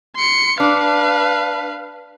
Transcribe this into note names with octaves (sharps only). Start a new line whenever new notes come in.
C6 C#7
D4 B4 F5